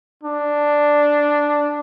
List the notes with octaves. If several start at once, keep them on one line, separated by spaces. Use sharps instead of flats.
D4